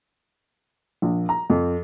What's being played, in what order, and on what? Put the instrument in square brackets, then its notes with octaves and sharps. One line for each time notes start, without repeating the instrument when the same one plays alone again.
[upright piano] A#1
A#5
F2